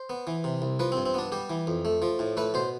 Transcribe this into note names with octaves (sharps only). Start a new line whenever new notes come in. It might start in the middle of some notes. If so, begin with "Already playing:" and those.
Already playing: C5
B3
E3
C3
C2
F3 B4
C4
G2
C4
B3 D4
G3 G4
E3
F2
A3
F3
A2
A3 B4
B2 C5